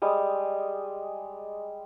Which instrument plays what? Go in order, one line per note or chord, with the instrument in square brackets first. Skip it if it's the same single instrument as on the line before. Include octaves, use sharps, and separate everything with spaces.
[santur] G3 G#3 D#6